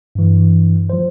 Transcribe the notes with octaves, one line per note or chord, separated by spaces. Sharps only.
G2 E3
F3 C5